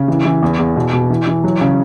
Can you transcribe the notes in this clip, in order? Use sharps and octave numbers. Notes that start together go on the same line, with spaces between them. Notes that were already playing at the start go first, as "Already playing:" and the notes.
Already playing: C#3
E3
E3
E2
E2
B2
B2
E3
E3
F#3
C#3